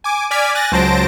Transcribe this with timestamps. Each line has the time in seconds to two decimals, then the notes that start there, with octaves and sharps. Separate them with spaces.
0.04 G#5 D6
0.31 D5 G#5 D6 F6 G#6 B6
0.55 G#5 F#6 A6 A#6
0.72 C#2 F#3 C5 A5 A#6 D7